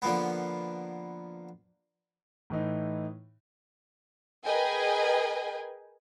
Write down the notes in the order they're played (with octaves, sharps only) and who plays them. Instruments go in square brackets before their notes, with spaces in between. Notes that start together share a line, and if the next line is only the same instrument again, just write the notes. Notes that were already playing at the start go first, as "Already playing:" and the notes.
[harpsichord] D3 F3 A#3 B3
[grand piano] A2 E3 D#4
[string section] G#4 A#4 B4 D#5 G5 G#5